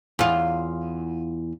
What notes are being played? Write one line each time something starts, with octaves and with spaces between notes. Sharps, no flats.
E2 F4